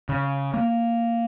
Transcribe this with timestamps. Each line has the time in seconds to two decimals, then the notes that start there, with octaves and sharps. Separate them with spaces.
0.09 C#3
0.54 A#3